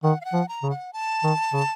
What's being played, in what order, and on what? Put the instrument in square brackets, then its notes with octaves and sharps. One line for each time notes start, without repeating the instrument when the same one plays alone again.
[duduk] D#3 [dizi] F#5
[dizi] F5
F#5
[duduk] F3
[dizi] A#5
[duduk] C#3
[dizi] F#5
A5
[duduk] D#3
C#3